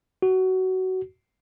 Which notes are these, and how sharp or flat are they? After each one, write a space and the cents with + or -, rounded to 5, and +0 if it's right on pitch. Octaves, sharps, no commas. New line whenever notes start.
F#4 +20